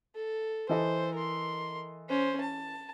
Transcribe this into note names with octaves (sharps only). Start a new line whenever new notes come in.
A4
E3 A4 C5 D#5
A#4 C6
C#4 C5
A5